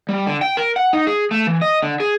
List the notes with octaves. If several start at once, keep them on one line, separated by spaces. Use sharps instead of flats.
G3
D3
G5
A#4
F#5
D#4
G#4
A3
E3
D#5
D3
G#4